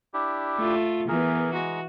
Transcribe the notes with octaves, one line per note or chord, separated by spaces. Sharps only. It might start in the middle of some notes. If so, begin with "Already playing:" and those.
D4 E4 G4
A3 F4
E3 B3 G#4 A#4
G#3 F#4 A#5